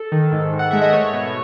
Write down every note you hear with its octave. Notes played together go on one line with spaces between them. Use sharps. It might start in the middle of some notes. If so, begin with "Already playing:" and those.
Already playing: A4
D#3
G#2
G#2
F#5
G#3 E5
D#5
A3 C#5
B2